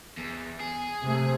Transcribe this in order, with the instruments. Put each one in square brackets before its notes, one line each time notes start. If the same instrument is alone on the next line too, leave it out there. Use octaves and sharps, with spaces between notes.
[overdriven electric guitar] E2
G#4
[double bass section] C3 A3